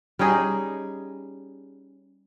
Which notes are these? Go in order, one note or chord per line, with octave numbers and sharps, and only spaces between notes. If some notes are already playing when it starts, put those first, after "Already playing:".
G3 C#4 D#4 G#4